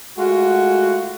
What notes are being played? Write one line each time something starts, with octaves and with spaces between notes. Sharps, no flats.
G#3 A3 F4 F#4